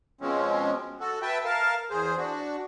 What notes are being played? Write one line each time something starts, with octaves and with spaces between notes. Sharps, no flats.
B2 F3 G#3 C4 C#4
F#4 A4
B4 E5 G5 A5
A#4 F5 A5
E2 G#4 C5
D4 F#4